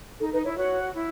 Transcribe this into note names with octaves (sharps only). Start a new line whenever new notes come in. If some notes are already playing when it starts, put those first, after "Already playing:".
D#4 A4
D#4 B4
E4 C#5
F#4 C#5
E4